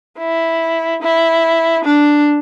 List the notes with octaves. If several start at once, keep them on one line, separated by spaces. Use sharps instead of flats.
E4
E4
D4